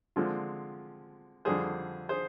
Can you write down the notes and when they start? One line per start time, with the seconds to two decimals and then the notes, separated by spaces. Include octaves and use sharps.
0.16 D3 F3 G#3 C4 F4
1.45 F2 D3 G3 G#4 C5
2.09 G#4 C5